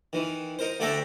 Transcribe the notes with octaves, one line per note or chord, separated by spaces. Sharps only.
D#3 E3
D#4 A#4 C5
D2 A3 D4 E5 G5 A#5